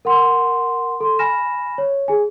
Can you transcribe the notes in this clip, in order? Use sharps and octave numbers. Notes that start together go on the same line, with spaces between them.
A#4 F#5 C6
A4 C6
G#5 B5 F6 A#6 E7
C#5
G#4 G#5